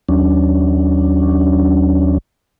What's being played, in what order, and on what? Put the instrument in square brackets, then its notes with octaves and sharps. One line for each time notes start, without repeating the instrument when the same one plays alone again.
[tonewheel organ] D#2 F#3 C#4 D4